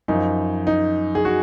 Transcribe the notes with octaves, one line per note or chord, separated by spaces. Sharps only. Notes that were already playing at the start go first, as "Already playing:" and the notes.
F#2 F3 D#4
D#4
G#4
F#4